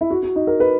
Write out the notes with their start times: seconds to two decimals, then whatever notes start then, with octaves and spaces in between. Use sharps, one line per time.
0.01 E4
0.11 F#4
0.23 F#4
0.36 D#4
0.47 A#4
0.60 B4